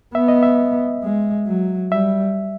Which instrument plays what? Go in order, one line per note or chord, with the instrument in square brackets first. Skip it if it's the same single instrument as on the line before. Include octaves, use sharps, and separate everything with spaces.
[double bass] B3 [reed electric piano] E5
[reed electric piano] D#5
E5
[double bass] G#3
F#3
[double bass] G3 [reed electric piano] E5